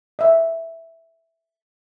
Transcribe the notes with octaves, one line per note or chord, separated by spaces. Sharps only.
D#5 E5